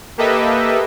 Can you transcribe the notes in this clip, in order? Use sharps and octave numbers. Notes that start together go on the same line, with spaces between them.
A#3 G4 A4 B4 D#5 E5